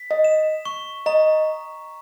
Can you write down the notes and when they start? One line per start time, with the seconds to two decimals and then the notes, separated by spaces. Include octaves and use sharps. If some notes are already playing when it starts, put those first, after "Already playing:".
Already playing: B6
0.11 D#5
0.24 E7
0.65 C#6
1.06 D#5 A#5